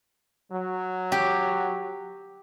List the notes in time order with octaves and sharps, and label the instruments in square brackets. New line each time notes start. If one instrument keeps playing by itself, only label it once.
[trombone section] F#3
[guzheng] G4